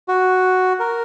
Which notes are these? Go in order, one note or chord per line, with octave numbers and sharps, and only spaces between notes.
F#4
A#4